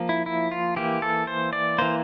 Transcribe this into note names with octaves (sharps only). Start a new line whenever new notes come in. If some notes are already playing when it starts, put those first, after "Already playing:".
Already playing: F3 A#3
E4
E4
F4
E3 A#3 G4
A4
C5
D5
E3 A#3 C5